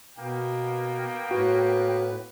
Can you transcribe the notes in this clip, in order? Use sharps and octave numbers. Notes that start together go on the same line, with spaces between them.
B2 A#3 B3 G5
A2 F#4 B4